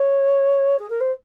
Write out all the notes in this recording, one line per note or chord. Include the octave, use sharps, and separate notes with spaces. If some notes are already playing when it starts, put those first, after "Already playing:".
Already playing: C#5
G#4
A#4
C5